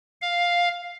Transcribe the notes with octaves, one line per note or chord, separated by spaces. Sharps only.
F5